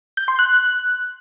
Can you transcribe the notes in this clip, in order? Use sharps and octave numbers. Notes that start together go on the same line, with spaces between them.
G6
C6
F#6